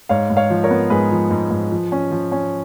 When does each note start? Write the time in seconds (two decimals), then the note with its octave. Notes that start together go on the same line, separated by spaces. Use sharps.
0.09 G#2 C#5 F5
0.30 G#2
0.37 C#5 F5
0.50 F3
0.64 A#4 C#5
0.70 B3
0.90 G#2 G#4 B4
1.11 F3
1.31 G#2
1.51 G#2
1.71 F3
1.92 C#4
2.11 F3
2.32 C#4